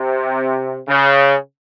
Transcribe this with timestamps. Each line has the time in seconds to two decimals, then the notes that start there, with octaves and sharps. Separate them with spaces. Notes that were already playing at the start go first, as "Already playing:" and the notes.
Already playing: C3
0.88 C#3